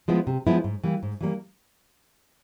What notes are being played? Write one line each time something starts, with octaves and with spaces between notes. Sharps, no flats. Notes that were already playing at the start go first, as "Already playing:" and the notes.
F3 G#3 B3 E4
C3
F3 G#3 B3 E4
G#2
E3 G3 A#3
G#2
E3 G3 A#3